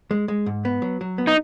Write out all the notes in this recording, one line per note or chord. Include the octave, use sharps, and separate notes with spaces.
G#3
G#3
G#2
B3
F#3
F#3
B3
D#4